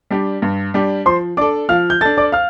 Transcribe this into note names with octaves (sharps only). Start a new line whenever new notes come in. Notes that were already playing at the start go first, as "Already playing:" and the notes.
G3 D4 G4
G2
G3 D4 G4
F3 C5 C6
D4 A4 D5 D6
F3 F5 F6
G6
D4 A4 A5 A6
D5 D6
F5 F6